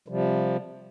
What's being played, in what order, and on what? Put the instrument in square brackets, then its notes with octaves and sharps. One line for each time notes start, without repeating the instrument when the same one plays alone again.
[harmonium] C3 F3 G3